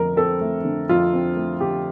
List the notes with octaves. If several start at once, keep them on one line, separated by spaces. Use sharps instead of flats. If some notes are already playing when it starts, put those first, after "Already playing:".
Already playing: F2 D3 A3 A#4
C4 A4
A3
D3
F2 F4
C4
A3
D3 G4